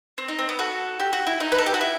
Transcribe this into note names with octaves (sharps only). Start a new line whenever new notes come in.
C4
D#4
C4
B3
F#4 A4
G4
F#4
E4
D#4
B4
A4
G4
F#4
E4